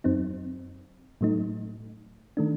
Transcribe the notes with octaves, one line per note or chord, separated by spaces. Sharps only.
F#2 F#3 C4 D#4
A2 F#3 A3 D#4
D#3 A3 D4